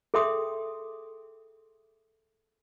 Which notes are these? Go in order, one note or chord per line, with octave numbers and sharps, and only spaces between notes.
G#4 A4 E5 G5 C6 D#6